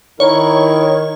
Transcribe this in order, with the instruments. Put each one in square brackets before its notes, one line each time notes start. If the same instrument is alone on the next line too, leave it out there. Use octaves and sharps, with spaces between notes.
[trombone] D#3 [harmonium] E4 A#4 [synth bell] C#5